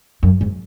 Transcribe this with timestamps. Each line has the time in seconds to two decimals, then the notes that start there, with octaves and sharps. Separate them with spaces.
0.23 F#2
0.41 G#2